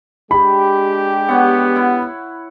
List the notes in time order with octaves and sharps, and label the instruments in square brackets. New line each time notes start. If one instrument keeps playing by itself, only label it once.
[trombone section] G#3 D4 G4 [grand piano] B5
[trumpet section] B3 [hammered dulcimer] B4 C#5 F#5
[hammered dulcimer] E4 F#5